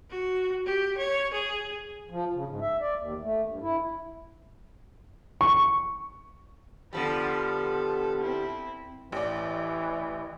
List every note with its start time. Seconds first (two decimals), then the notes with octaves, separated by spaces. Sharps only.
0.10 F#4
0.66 G4
0.98 C#5
1.33 G#4
2.10 F3
2.33 C#3
2.47 G#2
2.61 E5
2.81 D5
2.97 D#2
3.22 A3
3.45 G2
3.62 E4
5.41 C#6
6.93 D3 F3 G3 B3 A4
8.19 C4 E4
9.12 A1 E3 D5